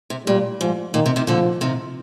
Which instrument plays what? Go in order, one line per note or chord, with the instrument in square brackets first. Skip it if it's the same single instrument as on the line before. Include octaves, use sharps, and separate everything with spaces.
[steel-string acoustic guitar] C3
[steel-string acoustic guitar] A#2 [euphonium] G3
[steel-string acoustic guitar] G#2 [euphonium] F3
[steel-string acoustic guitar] A#2 [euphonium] D#3
[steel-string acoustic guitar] C3
C3 D#3
[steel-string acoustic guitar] A#2 D3 [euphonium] F3
[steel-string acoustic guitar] C3 D#3